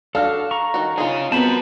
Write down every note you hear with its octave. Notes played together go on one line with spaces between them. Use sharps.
D4 F#4 A4 F5 F6
A#5 C#6
D#3 F#4
C#4 D#4 F4 G#4
B3 C4 F#4 A#4 A5 B5